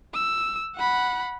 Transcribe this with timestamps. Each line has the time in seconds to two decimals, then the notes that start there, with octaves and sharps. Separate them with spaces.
0.14 E6
0.76 F#5 B5